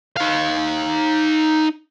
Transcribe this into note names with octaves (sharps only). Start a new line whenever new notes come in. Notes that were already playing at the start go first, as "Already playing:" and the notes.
D#4 F5